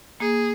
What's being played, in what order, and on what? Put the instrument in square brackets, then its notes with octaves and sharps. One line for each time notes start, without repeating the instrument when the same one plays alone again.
[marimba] A#3 [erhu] G#4